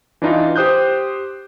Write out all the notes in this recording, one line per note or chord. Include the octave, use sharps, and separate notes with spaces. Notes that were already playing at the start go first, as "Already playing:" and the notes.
E3 D4 D#4 F4
G4 C5 D#6 F#6 G6